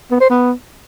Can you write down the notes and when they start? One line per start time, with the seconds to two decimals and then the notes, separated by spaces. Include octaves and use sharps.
0.11 B3
0.21 C5
0.30 B3